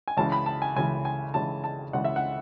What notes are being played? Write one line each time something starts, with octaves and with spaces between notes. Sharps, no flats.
G#5
C#2 C#3 E3 A5
B5
A5
G#5
C#2 C#3 E3 G#5
G#5
C#2 C#3 E3 A5
A5
C#2 C#3 E3 F#5
E5
F#5